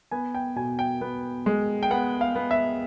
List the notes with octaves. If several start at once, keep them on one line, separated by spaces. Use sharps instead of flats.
B3 G#5
G5
B2 G#5
G5
B3
G#3
G5
B3 F#5
F5
B3
E5